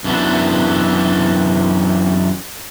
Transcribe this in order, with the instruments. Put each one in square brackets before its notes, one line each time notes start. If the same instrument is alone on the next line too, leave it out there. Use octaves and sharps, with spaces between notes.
[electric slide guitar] F#2 E3 B3 D4